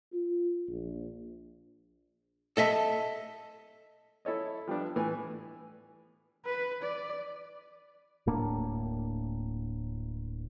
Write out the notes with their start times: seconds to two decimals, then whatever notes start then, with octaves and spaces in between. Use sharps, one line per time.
0.13 F4
0.69 A#1
2.57 A4 D#5 E5 A5
4.25 E4 A4 C#5 D#5
4.68 F3 G3 B3 D4
4.96 A2 E3 B3 B4 G#5
6.45 B4
6.83 D5
8.26 D1 A2 A#3 D4